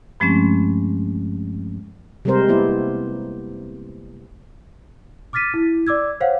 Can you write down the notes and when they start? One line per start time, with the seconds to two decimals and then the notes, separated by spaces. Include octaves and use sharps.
0.20 G2 F3 G#3 A3 C4 C#4
2.25 C3 G3 G#3 C4 A#4 C5
2.48 A#3 B3 E4 D5
5.33 D6 F6 A6 B6 D#7
5.54 E4
5.87 D5 D6 E6 G#6
6.20 C5 C#5 F5 F#5